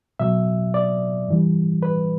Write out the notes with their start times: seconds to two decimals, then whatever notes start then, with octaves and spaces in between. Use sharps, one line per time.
0.20 B2 F#3 E5
0.74 D5
1.28 G2 E3 G3
1.83 B4